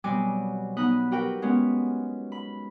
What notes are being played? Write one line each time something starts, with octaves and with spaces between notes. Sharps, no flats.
B2 F#3 G3 C4 G#5 D6
B3 D#4 B5 D#6 F#6
F#4 G4 A#4 B4 G5
G#3 B3 C#4
B5